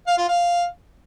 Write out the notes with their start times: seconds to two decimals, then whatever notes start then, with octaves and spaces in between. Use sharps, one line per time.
0.07 F5
0.17 F4
0.28 F5